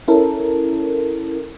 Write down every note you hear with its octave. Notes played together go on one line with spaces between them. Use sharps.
C#4 E4 A4 A#4